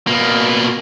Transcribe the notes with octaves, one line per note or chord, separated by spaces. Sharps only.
B2 A#3